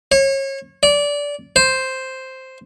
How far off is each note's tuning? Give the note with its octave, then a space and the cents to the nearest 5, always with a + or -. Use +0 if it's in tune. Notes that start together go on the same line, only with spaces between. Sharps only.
C#5 -30
D5 -20
C5 +0